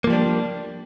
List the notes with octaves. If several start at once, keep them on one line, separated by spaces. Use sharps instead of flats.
F3 G3 A#3 D4